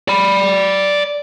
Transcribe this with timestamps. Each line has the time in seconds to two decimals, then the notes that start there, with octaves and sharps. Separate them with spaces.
0.08 D5 B5